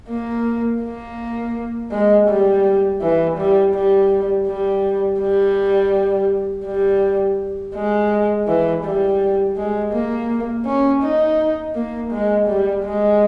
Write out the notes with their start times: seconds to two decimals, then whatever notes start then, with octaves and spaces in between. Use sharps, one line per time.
0.09 A#3
0.83 A#3
1.91 G#3
2.28 G3
3.01 E3
3.38 G3
3.74 G3
4.47 G3
5.20 G3
6.66 G3
7.75 G#3
8.47 E3
8.84 G3
9.56 G#3
9.93 A#3
10.65 C#4
11.03 D#4
11.75 A#3
12.12 G#3
12.48 G3
12.84 G#3